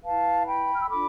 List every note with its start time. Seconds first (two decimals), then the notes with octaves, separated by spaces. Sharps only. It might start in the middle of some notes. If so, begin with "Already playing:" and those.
0.04 E4 B4 F5 A5
0.46 G5 B5
0.74 F6
0.81 E6
0.90 D4 F4 A4 B5 D6